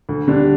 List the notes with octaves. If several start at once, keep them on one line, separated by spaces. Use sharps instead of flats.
D2
D3 G3 D4